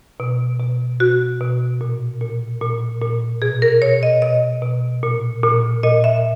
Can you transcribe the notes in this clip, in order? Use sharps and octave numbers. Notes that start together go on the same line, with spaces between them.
B2
B2
B2 F#4
B2
A#2
A#2
A#2
A#2
B2 G#4
A#4
B2 C#5
D#5
B2 D#5
B2
A#2
A#2
A#2 D#5
E5